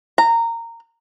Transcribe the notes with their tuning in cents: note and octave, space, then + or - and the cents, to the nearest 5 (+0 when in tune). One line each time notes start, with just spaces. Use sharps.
A#5 -15